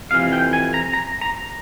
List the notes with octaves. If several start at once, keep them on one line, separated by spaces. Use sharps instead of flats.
F2 C3 E3 F5
G5
G#5
A#5
A#5
A#5